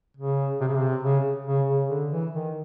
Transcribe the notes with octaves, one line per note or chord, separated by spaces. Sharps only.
C#3
C3
C#3
C3
C#3
C#3
C#3
D3
E3
D#3